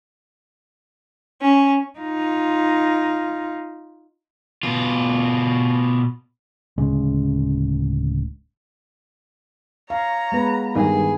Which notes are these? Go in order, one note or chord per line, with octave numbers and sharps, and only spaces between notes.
C#4
D#4 F4
B2 F4
D1 C#3 G#3 C#4
C#5 F5 A#5
G#3 B3 B4
G2 D#3 G#4